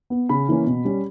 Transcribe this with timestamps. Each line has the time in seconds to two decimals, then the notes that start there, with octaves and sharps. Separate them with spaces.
0.10 B3
0.29 C#3 B5
0.49 E3 A#3 C#4
0.67 B2
0.85 G3 C#4